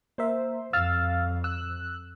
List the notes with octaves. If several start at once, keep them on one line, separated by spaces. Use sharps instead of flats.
A#3 A#4 C5 E5
F2 F5 E6 F6 A6
E6 F#6